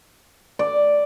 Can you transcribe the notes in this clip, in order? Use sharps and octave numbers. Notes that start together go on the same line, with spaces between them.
D5